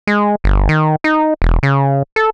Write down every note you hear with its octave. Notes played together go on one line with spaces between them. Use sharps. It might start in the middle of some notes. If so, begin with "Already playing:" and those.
G#3
G1
D#3
D#4
E1
C#3
A4